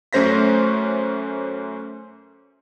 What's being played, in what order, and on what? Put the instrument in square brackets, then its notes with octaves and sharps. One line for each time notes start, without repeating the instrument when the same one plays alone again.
[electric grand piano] F#2 A3 C#4 C5 A#6 B6